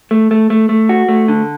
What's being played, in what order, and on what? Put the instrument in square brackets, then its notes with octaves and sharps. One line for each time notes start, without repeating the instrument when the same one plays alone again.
[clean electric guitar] A3
A3
A3
A3
F#4
A3
D3